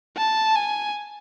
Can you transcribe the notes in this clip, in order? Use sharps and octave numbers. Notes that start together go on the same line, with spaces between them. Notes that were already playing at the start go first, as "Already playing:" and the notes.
A5
G#5